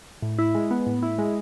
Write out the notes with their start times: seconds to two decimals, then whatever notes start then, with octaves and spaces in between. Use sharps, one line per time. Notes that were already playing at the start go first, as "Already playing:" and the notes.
0.22 A2
0.39 E4
0.55 G#3
0.71 B3
0.87 A2
1.03 E4
1.18 G#3